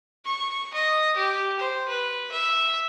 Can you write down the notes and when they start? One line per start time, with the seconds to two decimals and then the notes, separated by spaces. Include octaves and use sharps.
0.25 C#6
0.73 D#5
1.16 G4
1.59 C5
1.88 B4
2.31 E5